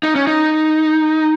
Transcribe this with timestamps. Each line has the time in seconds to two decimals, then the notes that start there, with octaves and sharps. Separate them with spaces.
0.03 D#4
0.15 C#4
0.27 D#4